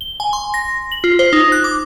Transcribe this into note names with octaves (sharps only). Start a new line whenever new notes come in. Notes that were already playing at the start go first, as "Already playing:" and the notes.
G7
G#5
C6
A#6
F#7
F4
C5
D#4
F#6
D6